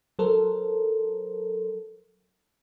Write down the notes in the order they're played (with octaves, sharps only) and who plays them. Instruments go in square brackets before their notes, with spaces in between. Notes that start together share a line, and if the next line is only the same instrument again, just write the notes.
[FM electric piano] F#3 A4 A#4 C5